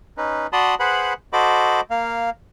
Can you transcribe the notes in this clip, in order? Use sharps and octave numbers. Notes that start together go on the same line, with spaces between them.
C#4 D#4 B4
F#4 D5 A5 B5 C6 D#6
G#4 B4 C5 F#5 B5
F#4 A4 C5 D#5 B5 D6
A#3 F5